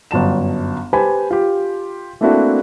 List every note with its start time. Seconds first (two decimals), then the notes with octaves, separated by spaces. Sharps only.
0.11 G1 F#2 A5 E7
0.93 G4 B4 C5 G#5 A5 B5
1.31 F4 G4
2.21 A3 A#3 C4 D4 E4 F#4